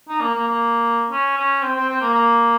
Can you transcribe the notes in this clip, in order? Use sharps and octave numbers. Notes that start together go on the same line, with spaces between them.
D#4
A#3
A#3
A#3
C#4
C#4
C4
C4
C4
A#3
A#3